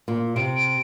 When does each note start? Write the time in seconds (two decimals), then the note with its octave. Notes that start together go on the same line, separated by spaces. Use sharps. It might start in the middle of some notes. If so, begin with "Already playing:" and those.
0.08 A#2
0.36 C3 D7